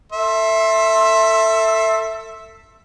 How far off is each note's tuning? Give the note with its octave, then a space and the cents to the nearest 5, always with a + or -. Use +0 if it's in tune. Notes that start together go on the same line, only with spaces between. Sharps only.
A4 +25 E5 +0 C6 +25